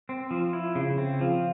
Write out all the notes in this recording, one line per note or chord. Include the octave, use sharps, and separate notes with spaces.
C4
F3
E4
C#3
C4
F3